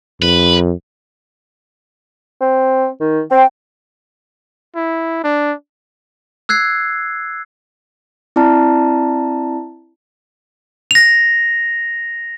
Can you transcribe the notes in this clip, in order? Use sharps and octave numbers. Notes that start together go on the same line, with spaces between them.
F2 B4
C4
D#3
C4 G5
E4
D4
E6 F#6 G#6 C7
C4 E4 D5 A5 A#5
A#6 F7